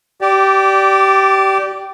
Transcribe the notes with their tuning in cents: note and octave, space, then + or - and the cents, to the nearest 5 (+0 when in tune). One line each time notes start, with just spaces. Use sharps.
G4 -20 D5 +0